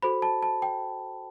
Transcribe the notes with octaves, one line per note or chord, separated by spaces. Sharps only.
F#4 A4 C5 B5
A5
A5
G5